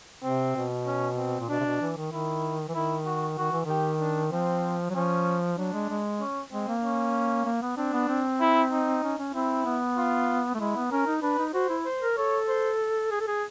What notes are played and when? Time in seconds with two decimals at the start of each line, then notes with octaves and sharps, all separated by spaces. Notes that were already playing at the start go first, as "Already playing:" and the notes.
0.24 C3 C4
0.56 B2
0.87 C#4
1.18 C4
1.40 A#2
1.49 B2 D4
1.60 C3
1.65 B2
1.81 E3
1.97 D#3
2.12 D#3 E4
2.69 E3
2.75 D#3 E4
3.06 F#4
3.38 D#3 F#4
3.52 E3
3.65 D#3 G4
4.00 D4
4.32 F3 C4
4.90 F#3
4.94 F3 C#4
5.58 F#3 D4
5.73 G#3
5.89 G#3
6.21 C#4
6.52 G#3 C4
6.68 A#3
6.83 C#4
7.45 A#3
7.62 B3
7.77 C4 D4
7.93 B3
8.09 C4
8.40 E4
8.72 D#4
9.04 C#4
9.18 C#4
9.34 C4 E4
9.66 B3
9.97 F4
10.55 A3
10.59 G#3 E4
10.76 B3
10.92 C#4 A#4
11.07 D#4
11.22 D4 B4
11.39 D#4
11.54 F#4 C5
11.70 E4
11.85 C5
12.02 A#4
12.17 A4 C#5
12.48 C5
13.11 G#4
13.20 A4
13.27 G#4